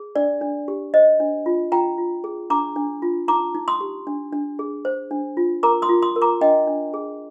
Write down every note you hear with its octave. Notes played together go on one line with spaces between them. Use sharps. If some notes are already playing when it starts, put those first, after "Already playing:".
Already playing: G#4
D4 D5
D4
G4
C5 D#5
D4
F4
F4 G5 A#5
F4
G#4
D4 A#5 D6
D4
F4
D#4 A#5 D6
D#4
C6 D#6
G4
D4
D4
G#4
C5
D4
F4
A#4 A#5 D6
C6 D#6
F4
C6 D#6
A#4
A#5 D6
D4 D#5 G5
D4
G#4